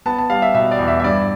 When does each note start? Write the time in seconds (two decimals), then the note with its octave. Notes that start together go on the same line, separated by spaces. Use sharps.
0.06 B3 A5
0.18 A5
0.30 G3 F5
0.42 E5
0.54 B2 E5
0.71 D5
0.79 E2
0.88 E5
1.00 E5
1.04 G2 D5